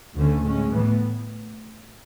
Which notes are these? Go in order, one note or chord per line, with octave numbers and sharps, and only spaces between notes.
D2 D3 A3 C#4
A2 G#3 C#4
A2 E3 B3